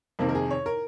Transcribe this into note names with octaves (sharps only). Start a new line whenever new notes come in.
F2 C3 D#3 A#3
A#4
G#4
C#5
A#4